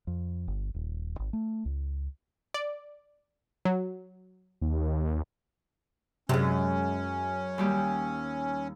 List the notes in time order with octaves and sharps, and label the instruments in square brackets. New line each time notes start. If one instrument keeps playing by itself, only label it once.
[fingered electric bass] F2
G1
D#1
G#1
A3
C#2
[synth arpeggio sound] D5
F#3
[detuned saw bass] D#2
[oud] F#2 G#3 [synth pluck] C3 [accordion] C#4
[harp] D#2 G3 G4